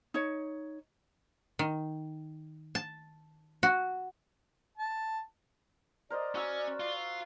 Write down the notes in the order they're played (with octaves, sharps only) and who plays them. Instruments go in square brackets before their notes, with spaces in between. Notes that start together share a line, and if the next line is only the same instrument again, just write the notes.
[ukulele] D#4 C#5
[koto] D#3
A5
F#4
[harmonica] A5
[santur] A#4 C5 D#5 [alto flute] D5
[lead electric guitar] C#4 [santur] F#4 E6
[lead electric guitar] F4